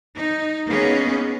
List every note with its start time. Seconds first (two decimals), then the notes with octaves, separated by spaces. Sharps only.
0.17 D#4
0.68 A#3 B3 C#4 D#4 G#4